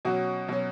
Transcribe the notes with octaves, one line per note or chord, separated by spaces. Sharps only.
B2 F#3 C#4 F#4
B2 F#3 C#4